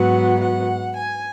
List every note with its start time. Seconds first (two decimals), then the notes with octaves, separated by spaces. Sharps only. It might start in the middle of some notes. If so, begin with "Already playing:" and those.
Already playing: G#2 F#3 B3 F#5
0.40 F#5
0.96 G#5